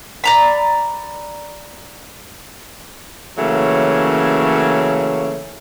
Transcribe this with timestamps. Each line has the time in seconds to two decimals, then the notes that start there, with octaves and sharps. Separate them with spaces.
0.24 D5 A#5 B5
3.38 C#3 E3 F#3 A3 A#3 C#4